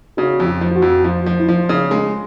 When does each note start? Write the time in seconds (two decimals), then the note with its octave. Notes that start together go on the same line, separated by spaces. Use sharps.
0.17 C#3 F#4
0.40 F2
0.46 F4
0.61 F3
0.71 F4
0.76 F#4
0.82 F2
1.04 F3 F4
1.26 F3
1.40 E4
1.48 F3 F4
1.69 C#3
1.91 G#3